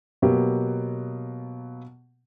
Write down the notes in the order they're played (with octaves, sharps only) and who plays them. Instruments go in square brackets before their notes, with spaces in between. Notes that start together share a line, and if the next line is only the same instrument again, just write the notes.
[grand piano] B2 F#3 A#3 B3 G4